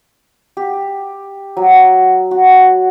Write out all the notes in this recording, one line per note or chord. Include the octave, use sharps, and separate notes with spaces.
G4
F#3
F#4